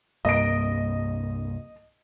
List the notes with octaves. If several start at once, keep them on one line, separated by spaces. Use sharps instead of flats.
C2 G2 A#3 D#5 D7